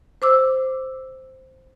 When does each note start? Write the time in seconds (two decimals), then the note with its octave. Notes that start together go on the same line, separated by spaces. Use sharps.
0.22 C5 D6 E6